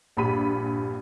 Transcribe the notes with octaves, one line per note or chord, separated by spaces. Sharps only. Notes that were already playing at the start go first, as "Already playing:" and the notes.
A#1 G2 G4 B5 D#7